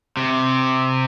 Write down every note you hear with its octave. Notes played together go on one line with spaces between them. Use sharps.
C3